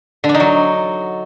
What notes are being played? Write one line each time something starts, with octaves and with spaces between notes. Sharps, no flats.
D3
D4
D#4
F#3